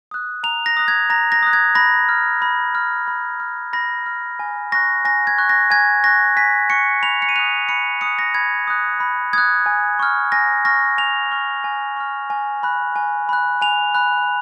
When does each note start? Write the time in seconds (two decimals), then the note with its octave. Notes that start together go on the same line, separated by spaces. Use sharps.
0.11 D#6 F#6
0.43 A#5 F7
0.66 A#6
0.77 D#6 F#6
0.88 G#6
1.10 A#5 A#6
1.32 A#6
1.43 D#6 F#6
1.53 G#6
1.75 B5 A#6
2.09 F6
2.42 B5
2.75 F6
3.08 B5
3.40 F6
3.73 B5 A#6
4.06 F6
4.39 G#5
4.72 C#6 F#6 A#6
5.05 G#5 A#6
5.27 G#6
5.38 C#6 F#6
5.49 A#6
5.70 G#5 G#6
6.04 C#6 F#6 A#6
6.36 G#5 B6
6.70 C#6 F#6 C#7
7.03 B5 F7
7.22 C#7
7.29 D#7
7.35 D#6 F#6 F7
7.69 B5 C#7
8.01 D#6 F#6 C#7
8.19 A#6
8.34 B5 G#6
8.67 D#6 F#6
9.00 B5
9.33 D#6 F#6 G#6
9.66 G#5
9.99 C#6 F6
10.32 G#5 A#6
10.65 C#6 F6 A#6
10.98 G#5 F7
11.31 C#6 F6
11.64 G#5
11.96 C#6 F6
12.30 G#5
12.63 B5 F#6
12.96 G#5
13.29 B5 F#6
13.62 G#5 F7
13.95 B5 F#6